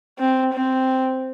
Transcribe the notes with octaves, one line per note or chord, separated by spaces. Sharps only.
C4
C4